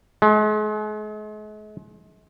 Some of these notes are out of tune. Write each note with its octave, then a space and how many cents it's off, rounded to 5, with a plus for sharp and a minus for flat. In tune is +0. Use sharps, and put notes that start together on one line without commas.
G#3 +40